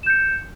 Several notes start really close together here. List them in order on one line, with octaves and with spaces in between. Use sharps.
E7 G6 C#7